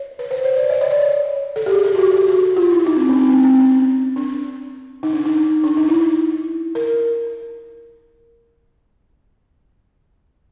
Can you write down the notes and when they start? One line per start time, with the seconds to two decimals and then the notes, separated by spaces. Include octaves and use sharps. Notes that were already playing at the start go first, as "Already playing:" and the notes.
Already playing: C#5
0.19 B4
0.31 C5
0.44 C#5
0.56 D5
0.70 D#5
0.81 C#5
0.91 D5
1.56 A4
1.66 G4
1.70 G#4
1.85 A4
1.95 F#4
1.99 G4
2.14 G4
2.28 F#4
2.57 F4
2.71 E4
2.86 D#4
2.96 C4
3.09 C#4
3.18 C4
3.29 C4
3.44 C4
3.59 C#4
4.16 D4
5.03 D#4
5.13 D4
5.25 D#4
5.64 D4
5.77 D#4
5.88 E4
6.75 A#4